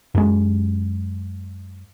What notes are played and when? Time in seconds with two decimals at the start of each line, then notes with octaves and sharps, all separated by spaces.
0.15 F#2 G#3